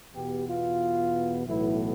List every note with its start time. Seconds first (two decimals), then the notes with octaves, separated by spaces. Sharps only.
0.15 E2 B2 B3 G4
0.48 F4
1.46 B1 A2 E3 B3 E4